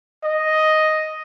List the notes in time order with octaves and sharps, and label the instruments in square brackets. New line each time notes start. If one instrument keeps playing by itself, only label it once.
[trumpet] D#5